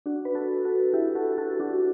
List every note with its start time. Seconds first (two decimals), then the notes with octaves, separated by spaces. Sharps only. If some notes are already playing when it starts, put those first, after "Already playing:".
0.06 D4 F#4
0.25 B4
0.35 F#4 A4
0.65 F#4 A4
0.93 E4 G4
1.15 F#4 A4
1.38 F#4 A4
1.60 D4 F#4